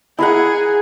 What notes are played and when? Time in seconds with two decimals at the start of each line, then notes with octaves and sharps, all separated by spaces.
0.19 E4 G#4 A#4 F#5